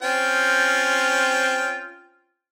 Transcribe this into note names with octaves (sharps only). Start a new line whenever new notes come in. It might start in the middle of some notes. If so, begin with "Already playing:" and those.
C4 C#4 F4 G5